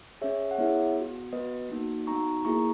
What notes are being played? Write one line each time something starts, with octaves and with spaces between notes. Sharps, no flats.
C#4 G#4 C#5 E5
F#5
B3 E4 G#4 C#5 E5
B3 F#4
B3 F#4 B4 D#5
A#3 D#4 F#4
B3 D#4 F#4 A#5 C#6
A#3 E4 G#4 A#5 C#6